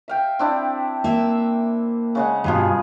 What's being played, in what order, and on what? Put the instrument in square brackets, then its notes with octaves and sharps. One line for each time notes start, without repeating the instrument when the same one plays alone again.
[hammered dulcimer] E5 F5 G5
C4 D4 E4
[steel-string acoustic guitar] A#3 E5
[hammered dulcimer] C#3 G#3 F#5
[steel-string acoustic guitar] G2 B2 [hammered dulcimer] F3 G#4 B4